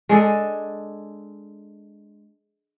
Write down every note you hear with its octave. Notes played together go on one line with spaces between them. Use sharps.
G#3 D4 G#4 A4